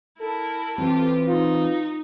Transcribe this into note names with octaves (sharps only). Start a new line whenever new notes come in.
E4 A4 A#4
E3 C4 F4 G4
D#4 F4